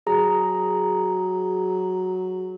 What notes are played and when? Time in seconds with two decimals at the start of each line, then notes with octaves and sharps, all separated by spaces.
0.07 F#3 G#4 A#5